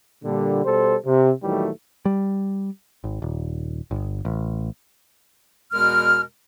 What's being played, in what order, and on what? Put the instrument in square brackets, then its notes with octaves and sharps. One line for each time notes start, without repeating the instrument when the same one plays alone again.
[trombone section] A#2 D3 G3
B2 G3 A4 C5
C3
A#1 D#3 E3 F#3 G3 A3
[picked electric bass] G3
G#1
D#1
G1
A1
[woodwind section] E2 B2 G#3 A#4 F6